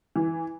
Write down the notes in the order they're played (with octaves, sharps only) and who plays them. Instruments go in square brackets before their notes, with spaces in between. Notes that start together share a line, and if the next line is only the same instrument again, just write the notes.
[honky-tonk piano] E3